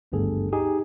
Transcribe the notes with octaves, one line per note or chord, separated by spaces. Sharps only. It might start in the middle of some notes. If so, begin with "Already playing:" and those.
G#1 D2 G2 B3 G#4 A4
D#4 G4 G#4